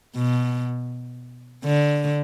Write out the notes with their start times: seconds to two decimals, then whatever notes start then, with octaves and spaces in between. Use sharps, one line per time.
0.15 B2
1.65 D3